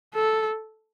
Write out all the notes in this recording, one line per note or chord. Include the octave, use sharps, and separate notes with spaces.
A4